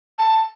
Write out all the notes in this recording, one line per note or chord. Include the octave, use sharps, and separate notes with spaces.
A5